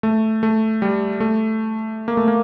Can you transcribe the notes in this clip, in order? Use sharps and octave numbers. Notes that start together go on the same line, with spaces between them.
A3
A3
G3
A3
A#3
A3
A#3